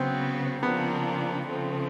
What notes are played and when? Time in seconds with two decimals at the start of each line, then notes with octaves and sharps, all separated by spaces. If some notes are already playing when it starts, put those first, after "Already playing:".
Already playing: C#3 F#3 B3 C4
0.63 C#3 F3 A#3 B3 D4
1.46 C#3 F3 A3 C4